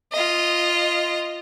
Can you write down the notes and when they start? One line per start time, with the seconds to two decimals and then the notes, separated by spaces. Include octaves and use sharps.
0.12 F4 D#5